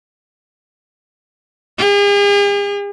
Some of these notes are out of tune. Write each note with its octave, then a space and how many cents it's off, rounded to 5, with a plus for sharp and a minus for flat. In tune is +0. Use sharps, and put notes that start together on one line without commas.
G#4 -45